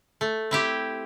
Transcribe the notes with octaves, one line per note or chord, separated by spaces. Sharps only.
A3
C4 E4 G4